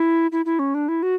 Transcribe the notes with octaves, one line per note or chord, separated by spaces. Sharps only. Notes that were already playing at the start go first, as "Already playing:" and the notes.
Already playing: E4
E4
E4
C#4
D4
E4
F#4